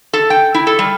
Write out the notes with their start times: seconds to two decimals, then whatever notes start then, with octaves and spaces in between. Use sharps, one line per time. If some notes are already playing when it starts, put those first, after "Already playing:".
0.13 A4
0.30 G5
0.54 E4
0.67 A4
0.79 G3